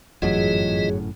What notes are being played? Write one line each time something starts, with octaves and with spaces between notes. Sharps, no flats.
G1 F#2 A2 E3 F#3 F4 G#4 D#5